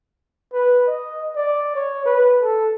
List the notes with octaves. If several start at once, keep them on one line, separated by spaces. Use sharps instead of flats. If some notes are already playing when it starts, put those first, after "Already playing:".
B4
D#5
D5
C#5
B4
A4